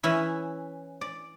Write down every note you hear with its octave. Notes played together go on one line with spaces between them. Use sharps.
E3 C#4 E4 B5
D5